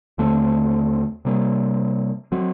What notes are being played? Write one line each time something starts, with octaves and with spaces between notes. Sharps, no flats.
D#2 D3 A3 C4
C3 G3 A#3
F#3 C4